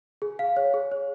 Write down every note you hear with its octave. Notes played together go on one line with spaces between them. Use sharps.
G#4
F5
C#5
G#4
C#5